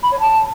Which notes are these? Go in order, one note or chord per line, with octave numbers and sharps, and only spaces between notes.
B5
C#5
A5